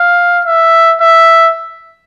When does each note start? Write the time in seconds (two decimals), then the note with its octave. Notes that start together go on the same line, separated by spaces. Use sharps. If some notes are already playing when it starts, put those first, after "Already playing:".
Already playing: F5
0.45 E5
1.00 E5